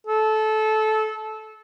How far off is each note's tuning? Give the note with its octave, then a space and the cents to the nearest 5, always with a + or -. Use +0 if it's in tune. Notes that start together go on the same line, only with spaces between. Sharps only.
A4 -20